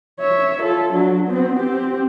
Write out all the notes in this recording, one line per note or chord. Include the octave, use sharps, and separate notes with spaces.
C#5 E5
F4 A4
F#3 D4
B3 C4
C4 G4